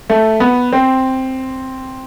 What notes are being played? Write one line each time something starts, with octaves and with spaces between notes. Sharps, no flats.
A3
B3
C4